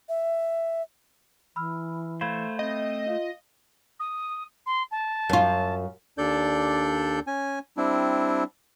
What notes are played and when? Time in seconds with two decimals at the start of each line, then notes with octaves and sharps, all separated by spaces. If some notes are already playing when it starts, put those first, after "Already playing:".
0.09 E5
1.56 E3 B5 E6 F6
2.21 A3 C5 F5 B5 G#6
2.59 C4 D#5
3.08 F4 F5
4.00 D#6
4.66 C6
4.91 A5
5.29 F#2 F4
6.18 D#2 D4 A4 D5 G6
7.27 C#4 G#5
7.77 G3 C4 D4 E4